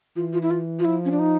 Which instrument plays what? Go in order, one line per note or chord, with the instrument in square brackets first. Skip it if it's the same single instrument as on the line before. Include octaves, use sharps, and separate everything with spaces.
[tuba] E3 [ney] F4
[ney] F4
E4
F4
F4
[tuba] F3 [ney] E4
[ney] C#4
D4
D#4